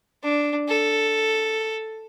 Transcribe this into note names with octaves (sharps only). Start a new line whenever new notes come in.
D4
A4